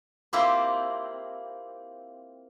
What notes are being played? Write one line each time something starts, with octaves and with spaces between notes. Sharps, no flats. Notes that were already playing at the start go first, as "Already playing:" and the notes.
A#3 C4 E4 F4 G4 C5